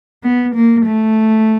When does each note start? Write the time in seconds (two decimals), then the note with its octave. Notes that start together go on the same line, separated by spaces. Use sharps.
0.23 B3
0.55 A#3
0.86 A3